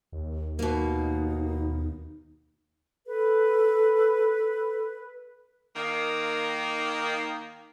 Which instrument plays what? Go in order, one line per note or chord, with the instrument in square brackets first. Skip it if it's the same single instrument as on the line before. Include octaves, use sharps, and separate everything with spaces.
[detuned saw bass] D#2
[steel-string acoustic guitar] B2 A#3 [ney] D#4
[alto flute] A4 [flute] B4
[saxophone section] D#3 A#3